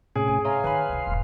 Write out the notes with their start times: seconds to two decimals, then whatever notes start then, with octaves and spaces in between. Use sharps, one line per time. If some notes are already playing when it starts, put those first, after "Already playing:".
0.16 A2 C3 C#4 G#4 D7
0.28 G#2 G#5
0.45 C#5 E5 F5 A#5 C6
0.64 D#3 B4 G#5 B5
0.89 C#2 C3
1.07 E1 G#2